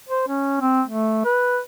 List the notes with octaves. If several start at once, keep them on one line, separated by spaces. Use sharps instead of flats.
C5
C#4
C4
A3
B4